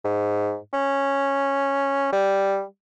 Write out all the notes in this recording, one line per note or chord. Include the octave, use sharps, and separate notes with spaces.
G#2
C#4
G3